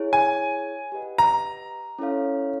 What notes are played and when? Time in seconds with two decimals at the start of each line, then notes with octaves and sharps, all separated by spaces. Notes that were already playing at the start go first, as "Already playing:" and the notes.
Already playing: E4 G#4 C#5
0.13 G#5
0.92 G4 B4 D#5 F#5
1.18 A#5
1.99 C#4 E4 A4 C#5 F5